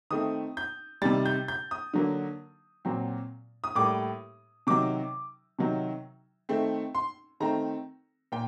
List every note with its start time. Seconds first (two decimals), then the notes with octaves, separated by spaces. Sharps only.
0.11 D#3 A3 C4 D#6
0.57 G6
1.02 C3 D#3 G3 A6
1.26 G6
1.48 G6
1.71 D#6
1.94 D3 F#3 A#3
2.85 A#2 F#3 C4
3.64 D#6
3.75 A2 G3 A#3 D6
4.67 C3 D#3 F#3 D6
5.59 C3 D#3 F#3
6.49 D#3 A3 C4
6.95 C6
7.40 D#3 A3 C4 A#5
8.32 A#2 G5